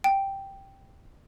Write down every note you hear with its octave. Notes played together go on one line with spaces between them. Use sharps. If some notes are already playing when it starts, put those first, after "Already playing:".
G5